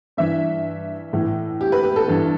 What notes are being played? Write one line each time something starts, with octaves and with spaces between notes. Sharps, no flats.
G2 E3 E5
A2 E3
G4
B4
G4
A4
G2 E3